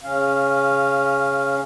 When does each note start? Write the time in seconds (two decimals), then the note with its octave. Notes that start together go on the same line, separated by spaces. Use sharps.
0.04 C#3 C#4 F5